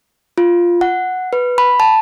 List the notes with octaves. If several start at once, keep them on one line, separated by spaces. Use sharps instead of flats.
F4
F#5
B4
B5
A5